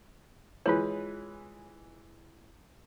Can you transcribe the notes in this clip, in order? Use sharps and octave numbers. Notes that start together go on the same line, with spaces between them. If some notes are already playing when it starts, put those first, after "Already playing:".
E3 G#3 F4 B4 C#5